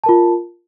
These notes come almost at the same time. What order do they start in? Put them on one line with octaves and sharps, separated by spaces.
A5 A#4 F4